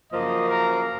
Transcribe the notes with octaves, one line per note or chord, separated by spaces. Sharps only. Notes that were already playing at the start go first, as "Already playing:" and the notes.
F#2 C#3 F3 A#3 D#5
A#4